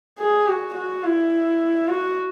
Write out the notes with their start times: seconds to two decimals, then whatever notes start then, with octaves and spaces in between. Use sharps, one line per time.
0.19 G#4
0.47 F#4
0.75 F#4
1.04 E4
1.88 F#4